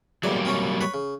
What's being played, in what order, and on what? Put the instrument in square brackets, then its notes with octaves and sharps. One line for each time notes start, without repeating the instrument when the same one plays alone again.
[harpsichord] E2 D5 [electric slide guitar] F#3 G3 A#3
[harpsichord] C4 C#4 C#5
B4 C#5
C#3